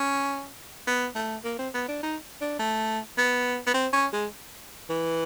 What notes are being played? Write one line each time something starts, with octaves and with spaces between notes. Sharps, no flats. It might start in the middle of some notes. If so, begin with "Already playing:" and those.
Already playing: C#4
B3
A3
A#3
C4
B3
D4
D#4
D4
A3
B3
B3
C4
C#4
G#3
E3